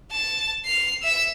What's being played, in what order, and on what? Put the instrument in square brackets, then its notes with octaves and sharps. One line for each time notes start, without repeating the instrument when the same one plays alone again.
[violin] A5
C7 F7
E5 E6